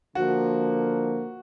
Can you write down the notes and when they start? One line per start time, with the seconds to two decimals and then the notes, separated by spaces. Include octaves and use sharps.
0.15 D3 F3 A#3 F#4